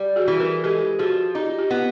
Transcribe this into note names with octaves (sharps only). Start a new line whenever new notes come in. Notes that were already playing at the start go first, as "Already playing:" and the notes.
Already playing: G3
F#4 G#4
E3
G#4 A#4
G#3 G4 A4
F3 F#4 G#4
D#4 F4 G4
F4 G4
B3